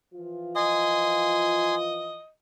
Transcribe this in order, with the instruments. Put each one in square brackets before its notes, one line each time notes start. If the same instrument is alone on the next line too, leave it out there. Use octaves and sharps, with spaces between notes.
[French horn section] E3 F3 F4
[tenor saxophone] D#5 [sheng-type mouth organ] G#5 C6